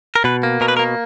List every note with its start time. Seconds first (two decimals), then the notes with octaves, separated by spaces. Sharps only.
0.16 A#4
0.24 B2 B4
0.43 A#3
0.61 B2 A#4
0.68 B4
0.77 A#4
0.79 A#3